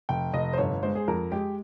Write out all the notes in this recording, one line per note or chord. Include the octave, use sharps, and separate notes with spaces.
F1 G5
F1 D#5
C5
G1 C#5
G#3 C5
G#4
F2 A#4
G#3 G4